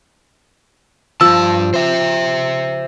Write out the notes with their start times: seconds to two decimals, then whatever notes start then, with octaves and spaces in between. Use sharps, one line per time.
1.21 G2 F3 A5 E6
1.74 C5 E5